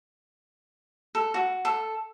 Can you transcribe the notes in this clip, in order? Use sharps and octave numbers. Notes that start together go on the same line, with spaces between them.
A4
F#4
A4